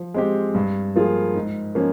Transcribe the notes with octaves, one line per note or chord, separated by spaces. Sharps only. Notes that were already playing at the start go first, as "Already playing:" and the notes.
Already playing: F3
G#3 C4 G4
G2
F3 A#3 F4 G#4
G#2
F3 A#3 C#4